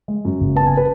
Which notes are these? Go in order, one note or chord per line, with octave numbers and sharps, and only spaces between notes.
G#3
F#2
F#1
B3 A5
G#5
B4